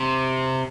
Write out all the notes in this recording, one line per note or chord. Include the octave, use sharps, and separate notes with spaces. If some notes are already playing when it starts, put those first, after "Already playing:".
Already playing: C3